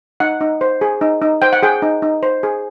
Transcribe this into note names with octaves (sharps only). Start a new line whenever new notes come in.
D#4 F#5
D#4
C5
G#4
D#4
D#4
C5 G5
F#5
G#4 G5
D#4
D#4
C5
G#4